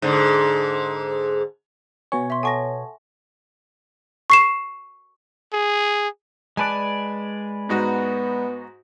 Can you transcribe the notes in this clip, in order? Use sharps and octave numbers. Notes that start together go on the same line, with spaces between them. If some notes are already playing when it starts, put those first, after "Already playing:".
G#2 D3
B2 B3 C#5 G#5
E5 C6 B6
A4 F#5 G#5 A5 C#6 A#6
C#6 C7 E7
G#4
G#3 B4 D5 G#5 A5 F#6
G#2 B3 D#4 F#4